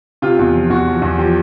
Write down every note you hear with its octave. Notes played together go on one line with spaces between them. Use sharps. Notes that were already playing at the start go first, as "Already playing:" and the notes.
C3 F4
E2
F3
E2 F#4
F3
E2
F3 G4